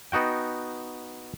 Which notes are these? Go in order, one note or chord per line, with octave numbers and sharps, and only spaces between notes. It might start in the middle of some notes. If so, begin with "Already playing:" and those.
B3 D#4 F#4 G5